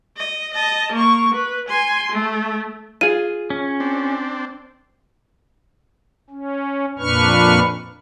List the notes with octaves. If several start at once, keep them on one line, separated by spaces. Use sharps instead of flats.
D#5
D#5 A5
A#3 C#6
B4
G#5 C6
A3
F4 G#4 D#7
C#4
C4 D4
C#4
F2 A#2 D4 B4 C#6 F6